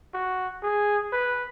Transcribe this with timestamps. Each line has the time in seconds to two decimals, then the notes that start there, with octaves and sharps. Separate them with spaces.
0.14 F#4
0.62 G#4
1.12 B4